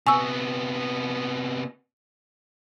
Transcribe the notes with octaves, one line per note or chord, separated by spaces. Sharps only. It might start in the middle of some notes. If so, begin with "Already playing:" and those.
C3 B3 G#5 C#6 E6